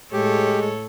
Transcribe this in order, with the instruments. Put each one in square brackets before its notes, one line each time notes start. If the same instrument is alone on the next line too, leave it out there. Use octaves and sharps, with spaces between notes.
[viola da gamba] A2 A4 C#5 [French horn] G#3 [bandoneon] G4